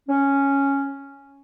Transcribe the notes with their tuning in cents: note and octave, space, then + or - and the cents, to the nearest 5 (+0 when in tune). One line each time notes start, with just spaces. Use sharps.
C#4 +0